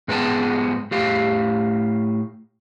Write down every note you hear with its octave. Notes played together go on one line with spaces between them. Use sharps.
G#2 G#3 B3 A4 G5 A5
A2 G4 F5